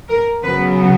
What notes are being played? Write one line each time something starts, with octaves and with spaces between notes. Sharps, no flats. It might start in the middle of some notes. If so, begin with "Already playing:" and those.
A#4
C#3 F#3 B3 B4